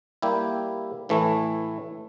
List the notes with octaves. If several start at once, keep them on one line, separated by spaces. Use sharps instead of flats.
G3 A#3 E4 G4
A2 E3 A3 E4